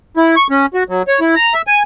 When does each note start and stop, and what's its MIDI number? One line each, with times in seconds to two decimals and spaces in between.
0.17 0.35 64
0.36 0.47 85
0.50 0.66 61
0.74 0.83 66
0.89 1.02 54
1.08 1.20 73
1.20 1.35 64
1.35 1.54 82
1.54 1.62 76
1.67 1.83 80